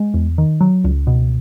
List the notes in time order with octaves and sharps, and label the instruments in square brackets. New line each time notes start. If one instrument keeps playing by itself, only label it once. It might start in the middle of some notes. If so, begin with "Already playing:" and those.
Already playing: [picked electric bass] G#3
E2
D#3
F#3
C#2
B2